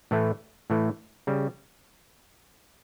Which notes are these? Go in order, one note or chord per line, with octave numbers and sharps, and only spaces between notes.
A2 E3 A3
A2 E3 A3
C#3 G3